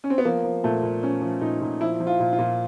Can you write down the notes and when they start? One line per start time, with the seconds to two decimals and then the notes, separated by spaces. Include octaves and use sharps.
0.04 C#4
0.10 C4
0.18 B3
0.25 F3 A#3
0.44 F3
0.64 A#2 A3
0.83 A#2
1.03 F3 C#4
1.22 F3
1.41 A#2 D#4
1.61 A#2
1.81 F3 E4
2.00 F3
2.07 F4
2.20 A#2
2.33 F4
2.39 A#2